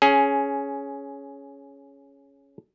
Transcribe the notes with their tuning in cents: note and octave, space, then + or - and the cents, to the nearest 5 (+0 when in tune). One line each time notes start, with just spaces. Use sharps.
C#4 +0 G#4 +15